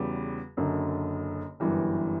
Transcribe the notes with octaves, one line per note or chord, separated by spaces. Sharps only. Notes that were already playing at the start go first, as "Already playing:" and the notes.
Already playing: E2 C#3 G3 B3 F#4
F#1 F#2 D3
G1 F#2 E3 G3